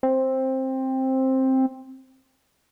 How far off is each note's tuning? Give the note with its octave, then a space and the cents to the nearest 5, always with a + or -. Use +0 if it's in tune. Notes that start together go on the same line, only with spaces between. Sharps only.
C4 +10